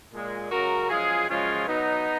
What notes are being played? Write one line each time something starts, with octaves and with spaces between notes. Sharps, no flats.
A#2 G#3
F#2 C#3 G#3 F#4 A#4
F#2 F3 G#3 F4 G#4
F#2 C#3 F3 G#3 C#4 F4
B2 F#3 B3 D#4